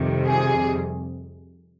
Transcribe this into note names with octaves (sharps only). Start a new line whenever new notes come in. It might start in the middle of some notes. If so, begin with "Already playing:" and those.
Already playing: F2 C3 D#3 G3
G#4